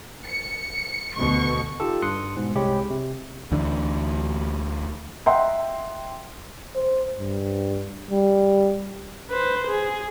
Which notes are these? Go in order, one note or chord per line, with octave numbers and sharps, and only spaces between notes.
C#7
D2 B2 C#6
D#4 F4 G4 A4
G2 C6 D#6 F#6 C#7
G#2 B2
C2 C3 G#3 G4 C#5 B5
C3
D2 D3 E3
D#5 E5 F#5 G5 A#5 C6
C5
G2
G3
B4 C5
G#4